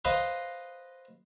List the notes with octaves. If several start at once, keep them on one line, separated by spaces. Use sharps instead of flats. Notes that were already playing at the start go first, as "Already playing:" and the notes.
B4 C5 D#5 F5 C6